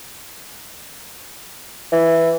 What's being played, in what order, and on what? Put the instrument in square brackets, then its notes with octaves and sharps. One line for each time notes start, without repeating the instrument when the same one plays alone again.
[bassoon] E3